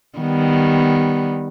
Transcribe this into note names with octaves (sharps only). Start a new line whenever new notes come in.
D#3 G3 B3